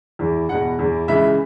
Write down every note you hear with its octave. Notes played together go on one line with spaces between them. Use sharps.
E2 E3
E2 B2 F#5
E2 E3
C#2 C#3 E3 E5